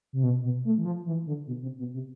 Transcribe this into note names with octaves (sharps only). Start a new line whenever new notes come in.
C3
B2
B2
A3
E3
F3
E3
D3
B2
C3
B2
C3